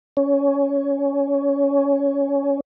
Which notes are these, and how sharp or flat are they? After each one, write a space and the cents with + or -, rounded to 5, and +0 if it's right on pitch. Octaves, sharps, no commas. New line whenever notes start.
C#4 +15